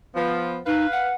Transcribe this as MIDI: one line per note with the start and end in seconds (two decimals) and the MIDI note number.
0.15 0.58 53
0.15 0.58 59
0.66 0.86 63
0.66 1.11 71
0.66 1.11 77
0.92 1.15 78